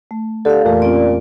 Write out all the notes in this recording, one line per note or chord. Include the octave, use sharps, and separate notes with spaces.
A3
D3 G4 A4 F5
F2 A#2 E3 A3
C4 C#4 F4 D5